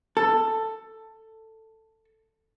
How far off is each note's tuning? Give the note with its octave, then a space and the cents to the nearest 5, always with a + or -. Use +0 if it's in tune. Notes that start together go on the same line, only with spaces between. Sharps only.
A4 +10